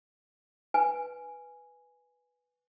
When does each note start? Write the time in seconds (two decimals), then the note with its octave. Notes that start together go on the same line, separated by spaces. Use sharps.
0.74 B4 G#5